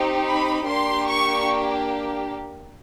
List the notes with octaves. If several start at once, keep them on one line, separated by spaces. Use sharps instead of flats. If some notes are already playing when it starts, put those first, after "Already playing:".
Already playing: C4 D#4 G4
B5
A#3 D4 G4 C6
C#6